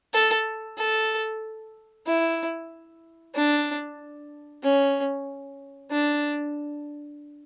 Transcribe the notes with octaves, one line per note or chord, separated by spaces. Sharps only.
A4
A4
E4
D4
C#4
D4